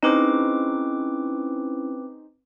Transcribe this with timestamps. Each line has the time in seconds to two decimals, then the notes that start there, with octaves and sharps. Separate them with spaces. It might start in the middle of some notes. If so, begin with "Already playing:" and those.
0.03 C4 C#4 D#4 E4 G#4 B4 C5 D6